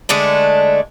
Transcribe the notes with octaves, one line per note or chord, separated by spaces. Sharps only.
D3 G#3 A3 D4